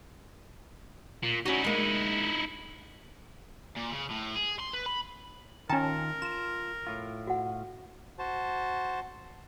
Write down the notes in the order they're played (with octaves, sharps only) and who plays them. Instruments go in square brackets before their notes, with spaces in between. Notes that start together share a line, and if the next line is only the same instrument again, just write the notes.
[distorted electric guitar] A#2
[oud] C#4 F#4 [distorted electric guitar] D#4 E4
[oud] G#3 A#3
[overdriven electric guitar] A#2
C#3
A2
G#4
C6
B4
B5
[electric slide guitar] D#3 F4 [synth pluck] C#4 A5 [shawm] A#4 [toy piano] G5 A#5
[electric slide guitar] F4 [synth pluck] E7
[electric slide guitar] A2 F4
[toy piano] F#4 F#5
[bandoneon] F#4 C5 A5